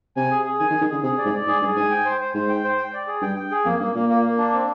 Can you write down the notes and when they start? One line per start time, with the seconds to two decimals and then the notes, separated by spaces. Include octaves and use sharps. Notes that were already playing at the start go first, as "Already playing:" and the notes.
0.16 C3 G#5
0.31 G#4
0.45 G#4
0.59 D#3 G#5
0.70 D#3
0.74 G#4
0.81 D#3
0.89 D3 G#4
1.03 C3 G#4
1.18 D5
1.25 G#2
1.33 D5
1.47 G#2 G#4
1.62 G2 G#4
1.76 G#2 G#5
1.91 G5
2.05 C5
2.21 C5
2.34 G#2 C5
2.49 G5
2.64 C5
2.78 G5
2.93 D5
3.07 G#4
3.22 G2 G5
3.36 G5
3.51 G#4
3.65 F2 A#3
3.80 G2 A#3
3.95 A#2 A#3
4.09 A#3
4.24 A#3
4.38 D4
4.53 C4